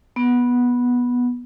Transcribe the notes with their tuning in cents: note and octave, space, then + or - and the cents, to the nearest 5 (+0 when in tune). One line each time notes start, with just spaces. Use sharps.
B3 -10